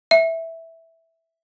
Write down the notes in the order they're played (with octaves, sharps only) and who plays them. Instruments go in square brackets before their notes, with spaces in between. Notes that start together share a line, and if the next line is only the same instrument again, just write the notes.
[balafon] E5